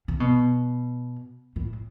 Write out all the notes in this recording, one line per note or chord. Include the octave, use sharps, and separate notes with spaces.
C#3
B2
A2